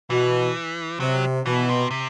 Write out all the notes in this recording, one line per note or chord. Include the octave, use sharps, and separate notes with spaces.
B2 E3
C3 F#3
B2 E3
C3
C3